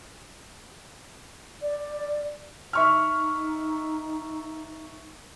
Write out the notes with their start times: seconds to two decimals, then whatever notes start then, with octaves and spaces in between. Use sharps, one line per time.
1.62 D5
2.73 D#4 E5 C#6 F6